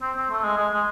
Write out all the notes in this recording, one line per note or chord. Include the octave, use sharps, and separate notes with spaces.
C4
C4
A3
G#3
G#3
G#3